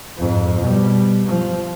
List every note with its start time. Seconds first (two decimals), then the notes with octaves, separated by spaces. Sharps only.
0.18 F2 G#2
0.59 B2 G3
1.26 F3